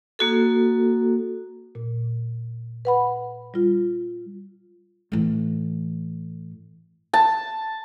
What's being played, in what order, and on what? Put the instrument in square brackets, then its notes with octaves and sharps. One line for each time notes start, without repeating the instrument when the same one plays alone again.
[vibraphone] A#3 F#4 A4
[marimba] A#2
B4 F#5 B5
G3 F4
[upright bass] A2 E3
[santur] A5